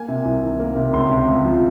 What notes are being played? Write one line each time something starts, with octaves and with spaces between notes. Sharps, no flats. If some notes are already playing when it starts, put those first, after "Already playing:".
Already playing: A#3 G#5
C3
C2
D#3
A#3
C3
C#2 C6
C3
C#2
F3